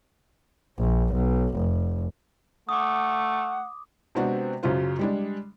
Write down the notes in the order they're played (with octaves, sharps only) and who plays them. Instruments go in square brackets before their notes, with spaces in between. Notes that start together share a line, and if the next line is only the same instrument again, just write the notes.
[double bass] A#1
B1
F1
[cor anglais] A3 [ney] F#5 [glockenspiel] D6 D#6
[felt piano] C3 G#3 B3 C4 D4 F#4
F#2 C#3 F#3 F4 C5
G3 G#3 D4